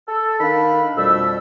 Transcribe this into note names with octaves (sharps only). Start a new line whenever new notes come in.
A4
D#3 D4 F5 B5
F2 B2 G3 A3 E6